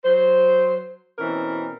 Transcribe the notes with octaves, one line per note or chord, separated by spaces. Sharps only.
F#3 C5
B2 E3 C4 C#4 A#4